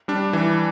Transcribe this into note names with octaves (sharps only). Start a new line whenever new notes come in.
G3 D4
E3